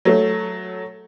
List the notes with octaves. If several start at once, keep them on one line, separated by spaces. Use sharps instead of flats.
F#3 A3